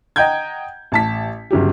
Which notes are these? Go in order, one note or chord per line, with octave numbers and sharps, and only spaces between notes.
D#5 F#5 G5 A#5 G6 G#6
A1 A5 B6
G1 C#3 F#3 G4